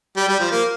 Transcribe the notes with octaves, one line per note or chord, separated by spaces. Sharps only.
G3
G3
F3
A#3